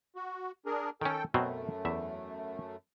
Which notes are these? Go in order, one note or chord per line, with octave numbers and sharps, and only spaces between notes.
F#4
D4 G#4 A#4
D#3 C#4 A4 G5
F#2 B2 F#3 A3 C4
E2 E5